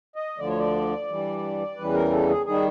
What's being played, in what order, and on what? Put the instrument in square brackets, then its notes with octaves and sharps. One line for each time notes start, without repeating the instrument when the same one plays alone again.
[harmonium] D#5
D2 D3 F3 D5
C#5
D5
G2 E3 G3
E2 C#3 E3 G3 B4
A#4
A4
G#4
D#3 G3 G#4